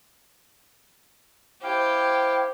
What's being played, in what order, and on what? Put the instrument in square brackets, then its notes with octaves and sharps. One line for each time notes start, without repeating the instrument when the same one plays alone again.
[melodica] E4 F5 [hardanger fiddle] G4 [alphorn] C5 [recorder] G5